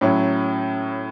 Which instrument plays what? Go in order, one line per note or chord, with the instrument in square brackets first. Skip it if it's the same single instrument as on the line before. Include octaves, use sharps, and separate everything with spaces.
[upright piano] A2 F#3 C#4 E4